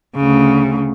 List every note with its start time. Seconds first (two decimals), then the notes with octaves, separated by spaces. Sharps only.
0.16 D2 C#3